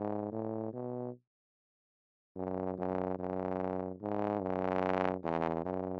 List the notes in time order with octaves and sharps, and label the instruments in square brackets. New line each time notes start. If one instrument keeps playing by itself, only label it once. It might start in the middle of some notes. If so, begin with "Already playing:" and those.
Already playing: [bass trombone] G#2
A2
B2
F#2
F#2
F#2
G#2
F#2
E2
F#2